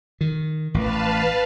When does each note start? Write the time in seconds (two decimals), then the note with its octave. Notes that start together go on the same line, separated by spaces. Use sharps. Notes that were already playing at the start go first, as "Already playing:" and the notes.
0.21 D#3
0.74 A1 B4 F5 A5